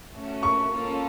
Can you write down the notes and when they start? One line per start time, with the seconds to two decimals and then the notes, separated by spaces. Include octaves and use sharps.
0.14 A3 C#4 F#4
0.43 C#6
0.72 A#3 C#4 F4 A4